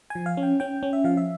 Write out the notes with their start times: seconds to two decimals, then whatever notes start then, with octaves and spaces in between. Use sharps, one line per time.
0.10 F3 G#5
0.26 F5
0.37 C#4
0.43 G5
0.60 C#4 G5
0.83 C#4
0.93 E5
1.04 F3 F5
1.17 E5